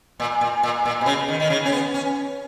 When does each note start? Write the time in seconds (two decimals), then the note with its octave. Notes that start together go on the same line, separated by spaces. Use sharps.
0.20 A#2
0.41 A#2
0.63 A#2
0.85 A#2
1.01 B2
1.06 C#3
1.28 D#3
1.40 D#3
1.50 C#3
1.65 C#4
1.72 B3
1.94 C#4